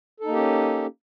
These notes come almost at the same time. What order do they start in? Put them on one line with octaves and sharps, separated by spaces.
A4 D#4 A#3 G4 C#4